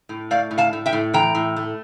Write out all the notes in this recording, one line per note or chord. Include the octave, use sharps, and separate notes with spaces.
A2
A3 D5 F5
A2
F5 A5
A2
E5 G5
A2
E3 G5 A#5
A2
A3